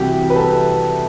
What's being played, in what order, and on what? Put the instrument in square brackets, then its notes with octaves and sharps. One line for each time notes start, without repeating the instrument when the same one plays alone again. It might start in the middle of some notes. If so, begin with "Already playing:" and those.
Already playing: [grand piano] C2 C3 E3 F#4 G4
B4
A4